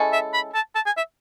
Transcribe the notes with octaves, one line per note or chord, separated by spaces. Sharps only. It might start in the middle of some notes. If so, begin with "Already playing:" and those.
Already playing: G#3 C#4 E4 A4
E5
B5
A5
A5
G#5
E5